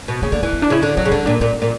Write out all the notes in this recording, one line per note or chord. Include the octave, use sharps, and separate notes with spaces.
B2
C#3 A#3
D3 A#3
E3 A#3
B3
D4
C#3 E4
D3 D4
F#3 C#4
C#3
D3 C#4
A#2 D4
A#2 C#4
A#2